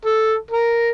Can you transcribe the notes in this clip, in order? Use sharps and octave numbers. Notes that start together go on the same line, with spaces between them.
A4
A#4